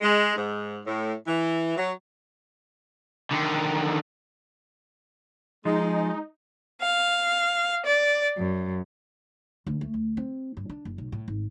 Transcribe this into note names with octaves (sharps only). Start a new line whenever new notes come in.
G#3
G#2
A2
E3
F#3
D3 D#3
F3 G#3 D#4
F5
D5
F#2
D2
A3
D2
C4
G2
D4
F#1
B1
A2
G#1